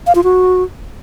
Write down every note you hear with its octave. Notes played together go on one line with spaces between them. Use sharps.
F5
F4
F#4